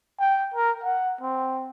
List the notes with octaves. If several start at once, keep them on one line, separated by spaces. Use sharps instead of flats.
G5
A#4
F#5
C4